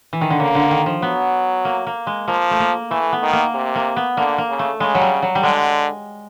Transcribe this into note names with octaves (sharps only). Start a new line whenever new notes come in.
E3
D#3
D3
C#3 A#3
D3
D#3
F3
F#3 B3
A#3
A#3
G#3
F3 A#3
A3
A#3
E3 A3
B3
D#3
A#3
C3
A#3
B3
D3 A#3
A#3
C#3
A3
C#3 G#3
F#3
G3
F#3
G3
D3 G#3